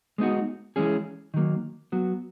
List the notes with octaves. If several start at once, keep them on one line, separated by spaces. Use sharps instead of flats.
G#3 B3 D#4 F#4
E3 G#3 C#4 G#4
D#3 F#3 A#3
F#3 B3 F#4